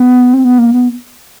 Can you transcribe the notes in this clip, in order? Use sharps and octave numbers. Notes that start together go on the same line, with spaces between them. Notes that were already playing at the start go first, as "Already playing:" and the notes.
Already playing: B3
C4
B3
A#3
B3